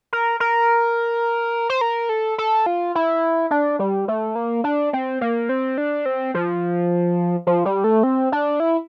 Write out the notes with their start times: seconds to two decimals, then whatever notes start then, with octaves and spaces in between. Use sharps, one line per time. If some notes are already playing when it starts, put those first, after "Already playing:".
0.13 A#4
0.40 A#4
1.69 C5
1.81 A#4
2.09 A4
2.38 A4
2.66 F4
2.95 E4
3.51 D4
3.79 G3
4.08 A3
4.35 A#3
4.64 D4
4.93 C4
5.21 A#3
5.49 C4
5.78 D4
6.06 C4
6.34 F3
7.47 F3
7.65 G3
7.84 A3
8.03 C4
8.32 D4
8.60 E4